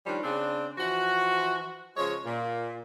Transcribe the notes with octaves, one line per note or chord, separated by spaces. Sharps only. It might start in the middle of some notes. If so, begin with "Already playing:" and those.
D#3 F3 G3 C#4 D4
C#3 C4 D4
E3 F3 F#4
C#3 F3 G#3 C#5
A#2